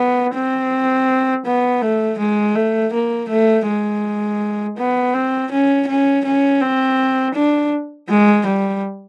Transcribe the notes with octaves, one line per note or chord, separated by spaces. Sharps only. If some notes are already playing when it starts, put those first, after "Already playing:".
Already playing: B3
C4
B3
A3
G#3
A3
A#3
A3
G#3
B3
C4
C#4
C#4
C#4
C4
D4
G#3
G3